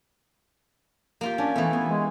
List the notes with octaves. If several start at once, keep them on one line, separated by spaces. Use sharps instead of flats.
A#3 F4 G4
C#4 D4
E3 A3 B3
B3 G#5
G#3